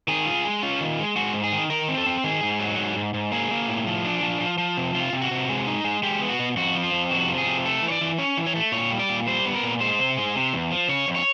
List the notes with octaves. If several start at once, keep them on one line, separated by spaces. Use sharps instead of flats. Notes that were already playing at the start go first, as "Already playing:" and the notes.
D#3 G#4
F4
G#3
C#4 F4
D#3
G#3
G#3 F#4
G#2
G#4
D#3
D#3 A#4
C4
A4
C4
D#3 G#4
G#2
F#3
G#2
G#2
G#2
A#3 G#4
A#3
A2
F3
D4
F3
F3
F3
C3
C3 F4
C3
F#4
C3
G#3
D#4
G#3
G#3 G4
B3
F#4
B2
F2 F#4
F3
F4
F2
C3 F#4
F3
G#4
C3
A3 A4
E3
C#5
D5
E3
C#4 C#5
E3
C#5
A3
A#2 C#5
G3
D5
A#2
G3 C5
B3
A#4
A#2
G#3 C5
C3
G#3
C3
E2
F3
C#3 C#5
F2
C#5